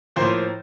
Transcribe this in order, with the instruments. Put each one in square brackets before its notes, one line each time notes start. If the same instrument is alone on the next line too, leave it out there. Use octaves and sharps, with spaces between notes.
[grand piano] A2 F3 A#3 C5